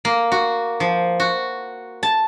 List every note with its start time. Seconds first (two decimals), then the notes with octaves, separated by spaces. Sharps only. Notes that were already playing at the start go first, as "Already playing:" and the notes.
0.05 A#3
0.32 F#4
0.80 F3
1.20 F#4
2.03 A5